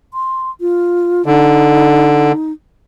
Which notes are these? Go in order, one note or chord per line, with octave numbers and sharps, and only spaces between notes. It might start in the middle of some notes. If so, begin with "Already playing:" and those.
C6
F4
D3 D#4